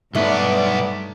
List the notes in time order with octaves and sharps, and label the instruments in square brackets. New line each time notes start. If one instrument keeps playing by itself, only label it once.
[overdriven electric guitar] B1 B3 [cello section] G2 D5 [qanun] A3 D#4